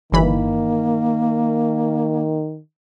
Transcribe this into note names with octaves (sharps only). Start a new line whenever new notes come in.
G1 D#3 E3 A#3 B5